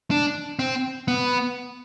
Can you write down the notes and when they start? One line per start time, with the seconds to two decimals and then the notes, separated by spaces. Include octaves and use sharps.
0.11 D4
0.59 C4
1.08 B3